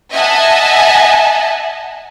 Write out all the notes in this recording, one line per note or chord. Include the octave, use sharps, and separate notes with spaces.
D#5 E5 F#5 G#5 A5